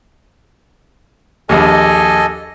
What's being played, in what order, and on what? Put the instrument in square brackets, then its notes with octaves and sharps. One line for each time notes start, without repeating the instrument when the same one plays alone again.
[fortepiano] A#1 D#2 [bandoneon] A4 D#5 G#5